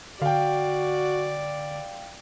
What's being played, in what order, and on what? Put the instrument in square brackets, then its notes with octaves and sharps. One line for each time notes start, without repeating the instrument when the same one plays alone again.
[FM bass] D3 [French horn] F#4 [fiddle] D5 [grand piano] F5 G5